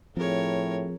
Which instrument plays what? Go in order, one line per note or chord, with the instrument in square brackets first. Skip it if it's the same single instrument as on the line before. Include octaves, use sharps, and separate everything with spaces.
[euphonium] A2 [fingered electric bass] F3 [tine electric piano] C4 G#4 [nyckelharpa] A#4 C#5